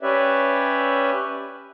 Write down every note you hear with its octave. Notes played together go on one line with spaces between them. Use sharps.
C#4 G4 B4 C#5 D5 E5